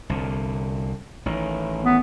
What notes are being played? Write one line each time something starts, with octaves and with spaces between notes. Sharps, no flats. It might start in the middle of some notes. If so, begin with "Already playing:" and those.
C2 D3
A1 D#3
B3